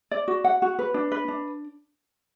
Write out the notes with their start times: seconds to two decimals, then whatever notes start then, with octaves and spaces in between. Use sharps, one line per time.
0.11 D5
0.28 F#4
0.44 F#5
0.62 F#4
0.79 B4
0.94 D4
1.12 B4
1.28 D4